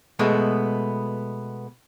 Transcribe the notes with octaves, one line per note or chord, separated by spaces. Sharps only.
B2 G#3 A3 B3